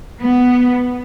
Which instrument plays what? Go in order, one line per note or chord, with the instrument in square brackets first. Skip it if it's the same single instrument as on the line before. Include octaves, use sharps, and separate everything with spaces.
[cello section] B3